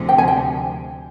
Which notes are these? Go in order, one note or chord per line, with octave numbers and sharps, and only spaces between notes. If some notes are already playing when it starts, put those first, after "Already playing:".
Already playing: D2 C3 F3
G5
G#5
G5